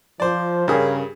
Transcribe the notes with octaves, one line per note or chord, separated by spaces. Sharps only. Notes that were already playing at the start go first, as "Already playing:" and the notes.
F3 C5 D5
G2 C#3 G#4 A#4